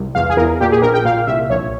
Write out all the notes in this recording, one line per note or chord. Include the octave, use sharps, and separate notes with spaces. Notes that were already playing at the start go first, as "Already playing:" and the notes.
Already playing: C2
E2 F5
G#4
E2 A#4
A#2 G4
G#4
A#1 A#4
G5
A#2 F5
C2 E5
A#1 C#5